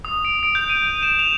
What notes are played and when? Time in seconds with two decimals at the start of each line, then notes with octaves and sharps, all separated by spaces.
0.05 D#6
0.25 D7
0.43 D7
0.55 G6
0.70 D#7
0.85 D#7
1.03 E7
1.19 F7